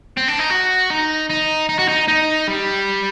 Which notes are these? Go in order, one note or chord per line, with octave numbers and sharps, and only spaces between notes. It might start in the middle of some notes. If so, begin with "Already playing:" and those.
C4
D4
D#4
F#4
D#4
D#4
D#4
F#4
D#4
D#4
G3